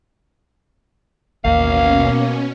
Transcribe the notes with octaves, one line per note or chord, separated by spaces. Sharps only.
A1 D#2 B2 A#3 C#4 F5